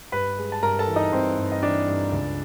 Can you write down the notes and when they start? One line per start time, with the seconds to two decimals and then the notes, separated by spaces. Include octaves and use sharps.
0.12 G2 B4 B5
0.38 G#3
0.52 A5
0.63 G2 A#4 A#5
0.79 A4 A5
0.88 E3
0.96 D#4 D#5
1.12 G2 C4 C5
1.38 G2
1.52 D#5
1.63 E3 D4 D5
1.88 G2
2.12 C#2